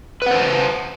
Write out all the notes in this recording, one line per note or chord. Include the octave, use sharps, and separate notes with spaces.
B4 C5 F#5 A5